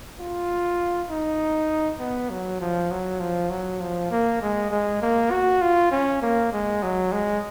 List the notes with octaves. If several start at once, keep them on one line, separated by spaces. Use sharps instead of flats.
F4
D#4
B3
F#3
F3
F#3
F3
F#3
F3
A#3
G#3
G#3
A#3
F#4
F4
C#4
A#3
G#3
F#3
G#3